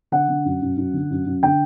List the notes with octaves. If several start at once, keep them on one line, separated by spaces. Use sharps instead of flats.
D3 F#5
D3
F#2
F#2
F#2
D3
F#2
F#2
D3 G5